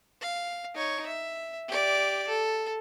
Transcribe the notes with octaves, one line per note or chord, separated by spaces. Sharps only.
F5
D#4 C#5
E5
G4 D5
A4